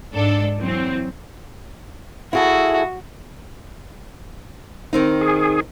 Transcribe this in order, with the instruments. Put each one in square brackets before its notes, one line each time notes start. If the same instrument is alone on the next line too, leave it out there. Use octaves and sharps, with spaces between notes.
[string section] G#2 D4 A4
E3 F#3 C4
[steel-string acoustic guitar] E4 G#4 A4 [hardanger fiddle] F#4
[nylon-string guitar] D#3 C4 D#4
[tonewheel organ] G#4